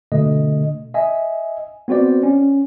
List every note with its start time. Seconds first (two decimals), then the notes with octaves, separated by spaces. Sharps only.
0.12 B2 D3 A3 D#5
0.94 D#5 E5 G#5
1.88 B3 C4 F#4 C5 D5
2.23 C#4